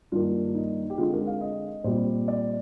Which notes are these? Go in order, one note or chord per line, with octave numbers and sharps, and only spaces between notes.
G2 D#3 A#3 F4
D#4
G4
D3 G#3 C4 F4
A#4
F5
D#5
A#2 G3 C4 C5
D5